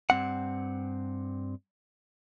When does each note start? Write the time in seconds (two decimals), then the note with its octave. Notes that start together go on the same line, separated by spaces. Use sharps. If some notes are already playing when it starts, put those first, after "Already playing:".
0.10 G2 C4 F#5